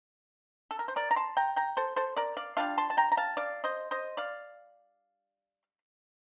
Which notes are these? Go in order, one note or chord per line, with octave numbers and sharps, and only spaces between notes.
A4
A#4
C5
A#4 D5
A#5
A5 C6
G5 A#5
G5 A#5
A4 C5
A4 C5
A#4 D5
D5 F5
G3 D4 F4 F5 A5
A5 C6
A5
G5 A#5
A#5
F5 A5
D5 F5
C5 D#5
C5 D#5
D5 F5